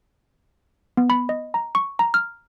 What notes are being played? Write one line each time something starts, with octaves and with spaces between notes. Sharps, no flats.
B3
B5
D#5
A#5
C#6
A#5
F6